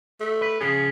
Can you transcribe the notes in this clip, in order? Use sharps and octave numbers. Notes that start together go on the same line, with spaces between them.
A3
B4
C#3 F3 C#4 G#4